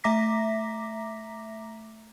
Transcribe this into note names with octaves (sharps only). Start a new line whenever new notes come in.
A3 E5 A#5 D6 A#6 B6